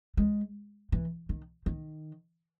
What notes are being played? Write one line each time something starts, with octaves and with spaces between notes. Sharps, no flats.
G#3
E3
D#3
D#3